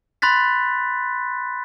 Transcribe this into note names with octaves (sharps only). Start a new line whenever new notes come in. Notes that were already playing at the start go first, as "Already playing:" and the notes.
B5 C6 F#6 A6 B6